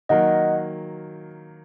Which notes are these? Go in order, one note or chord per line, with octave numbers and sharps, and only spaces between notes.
D#3 F#3 A#3 D#5 F#5